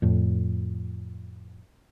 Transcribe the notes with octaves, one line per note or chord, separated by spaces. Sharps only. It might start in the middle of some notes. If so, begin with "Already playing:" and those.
F2 A2